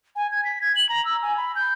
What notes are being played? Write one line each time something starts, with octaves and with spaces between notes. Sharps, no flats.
G#5
G#6
B6
G#6
F#7
A#5
E6
G#5
B5
G6